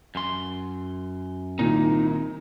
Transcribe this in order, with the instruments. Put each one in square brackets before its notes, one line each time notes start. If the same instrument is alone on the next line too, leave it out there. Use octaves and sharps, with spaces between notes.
[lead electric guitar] F#2 C6
[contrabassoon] C2 [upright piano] A#2 [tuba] D#3 [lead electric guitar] D#4